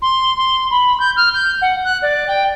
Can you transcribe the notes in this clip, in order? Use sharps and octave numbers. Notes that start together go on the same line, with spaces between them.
C6
C6
B5
G6
F6
G6
F#5
F#6
D5
G5